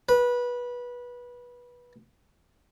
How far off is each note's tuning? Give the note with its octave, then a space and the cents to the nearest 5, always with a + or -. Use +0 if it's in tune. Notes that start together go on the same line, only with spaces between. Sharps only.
B4 -20